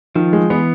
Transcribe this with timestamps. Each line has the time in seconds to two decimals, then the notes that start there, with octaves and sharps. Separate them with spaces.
0.15 D#3 F3
0.33 G#3
0.50 E3 B3